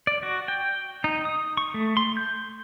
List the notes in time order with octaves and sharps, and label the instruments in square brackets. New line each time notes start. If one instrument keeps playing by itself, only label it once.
[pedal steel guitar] D5
F#4
G5
D#4
D#6
C#6
A3
C6
G6